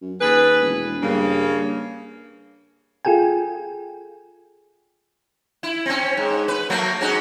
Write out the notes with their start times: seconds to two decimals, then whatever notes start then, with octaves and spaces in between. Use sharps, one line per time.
0.02 F#2
0.21 D#2 G#4 A4 B4
0.62 E1
1.02 G2 C#3 A#3
3.05 F4 G#4 A4 G5 G#5
5.63 E4
5.86 C4 C#4
6.17 G#2
6.48 B4
6.70 F#3 A3 A#3
7.01 G#2 C#4 F#4